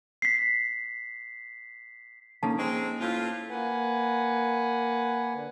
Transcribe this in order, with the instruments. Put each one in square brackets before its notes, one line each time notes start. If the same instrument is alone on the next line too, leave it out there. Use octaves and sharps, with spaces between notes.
[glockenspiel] B6 C7
[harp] A#3 C#4 [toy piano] D#4 A4 A5
[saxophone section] G#3 C4
A2 F4
[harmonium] A#3 B4 F#5 G#5
D3